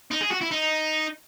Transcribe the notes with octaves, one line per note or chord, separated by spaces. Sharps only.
D#4
G#4
F#4
E4
D#4